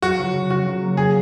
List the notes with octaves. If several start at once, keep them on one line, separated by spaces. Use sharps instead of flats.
F#3 F#4
C#3
C#3
C#3 F#4
F#3
A#3
C#3 G#4